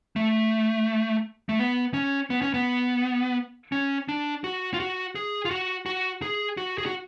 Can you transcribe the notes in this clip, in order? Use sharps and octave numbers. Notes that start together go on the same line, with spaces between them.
A3
A3
B3
C#4
B3
C#4
B3
C#4
D4
F#4
F4
F#4
G#4
F4
F#4
F#4
G#4
F#4
G#4
F#4